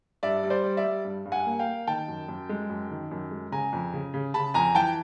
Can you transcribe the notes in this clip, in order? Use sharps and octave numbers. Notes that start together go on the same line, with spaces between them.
G2 D5 E5
G3
C5 D5
G3
D5 E5
G3
G2
G2
F#5 G#5
A#3
F5 G5
A#3
D#3 G5 A5
F#2
F#2
G#3
F#2
D#3
F#2
G#3
C#3 G#5 A#5
F2
C#3
C#3
C#3 A5 B5
F2 G#5 A#5
E3 G5 A5